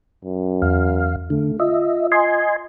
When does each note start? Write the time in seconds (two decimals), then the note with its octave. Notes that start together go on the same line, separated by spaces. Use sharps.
0.25 F#2
0.62 E2 F5
1.30 D3 A3
1.60 F4 D#5 E5
2.12 D#5 G#5 C6